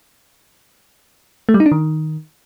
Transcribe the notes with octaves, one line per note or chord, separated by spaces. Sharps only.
A3
G3
D#4
D4
D#3